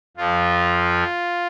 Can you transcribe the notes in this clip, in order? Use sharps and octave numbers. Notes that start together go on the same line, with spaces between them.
F2 F3 F4